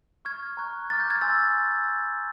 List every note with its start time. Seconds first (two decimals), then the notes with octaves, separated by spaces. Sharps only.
0.25 C#6 F6 G#6
0.57 A#5 C#6 F#6
0.90 A#5 D6 F6 A6
1.00 G6
1.10 G#6
1.21 G#5 C6 E6 A6